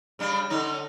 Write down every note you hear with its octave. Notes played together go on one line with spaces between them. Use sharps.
C#3 G3 D4
D3 C#4 D#4